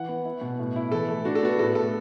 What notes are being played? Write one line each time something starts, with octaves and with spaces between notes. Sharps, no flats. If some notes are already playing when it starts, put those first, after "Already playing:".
Already playing: E3 F#5
B3
E4
B2
A2
E4
E3 A4
A3
D4 F#4
A4
B3 F#4
A2 A4
A2 A4